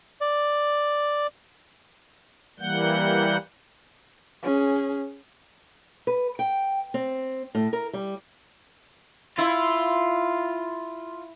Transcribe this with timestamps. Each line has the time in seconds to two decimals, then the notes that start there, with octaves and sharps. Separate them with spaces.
0.21 D5
2.60 E3 G3 A#3 F#5 G6
4.42 C#4 G#4
6.07 B4
6.39 G5
6.94 C4
7.55 A2
7.73 A#4
7.93 G3
9.38 E4 F4